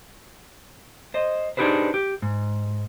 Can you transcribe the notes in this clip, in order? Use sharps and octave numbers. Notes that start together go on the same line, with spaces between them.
C5 D#5
D4 D#4 G4 G#4 B4 C5
G4
G#2